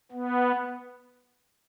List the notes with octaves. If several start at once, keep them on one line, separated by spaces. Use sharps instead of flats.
B3